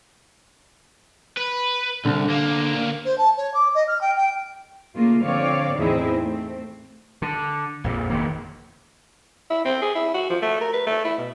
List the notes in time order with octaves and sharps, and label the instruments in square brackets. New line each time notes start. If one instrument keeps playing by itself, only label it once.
[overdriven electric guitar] B4
[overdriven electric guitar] C2 [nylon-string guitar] D3
[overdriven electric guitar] D2 A#3
[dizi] C5
A5
C#5
D6
D#5
F6
G5
G5
[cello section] C#3 A3 A#3 F4
D3 F3 C4 C#5 D5 F5
E2 A2 C4 D#4 E4 G#4
A3 C4
[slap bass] D3
A#1 F2 A#2
E1 D#3 A#3
[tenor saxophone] E4
C4
G#4
E4
F#4
F3
A3
A#4
B4
A3
E4
B2